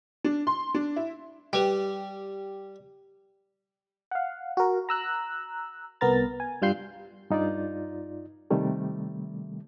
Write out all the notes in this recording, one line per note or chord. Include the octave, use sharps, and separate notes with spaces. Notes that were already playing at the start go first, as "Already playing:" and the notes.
D4
C6
D4
E4
G3 G4 B4 G5
F5 F#5
F#4 A#4
A#5 E6 F#6
C2 B3 A#4 A#5 A6
G#5
G2 G3 F4 G6 C7
G2 D#4 F4 D5
C3 D#3 G3 A3